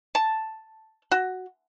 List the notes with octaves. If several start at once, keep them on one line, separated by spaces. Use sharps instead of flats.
A5
F#4